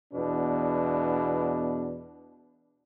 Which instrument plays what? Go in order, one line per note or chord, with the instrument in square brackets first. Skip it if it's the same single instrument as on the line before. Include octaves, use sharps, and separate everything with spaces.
[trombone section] E2 B2 B3 D4